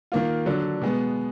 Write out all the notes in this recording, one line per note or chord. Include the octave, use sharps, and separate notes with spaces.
D#3 A#3 F4
D3 F#3 D4
B2 G#3 B3